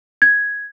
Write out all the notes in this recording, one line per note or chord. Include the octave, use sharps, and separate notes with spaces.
G#6